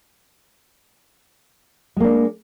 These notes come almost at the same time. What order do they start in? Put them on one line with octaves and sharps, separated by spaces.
G#3 A#3 D4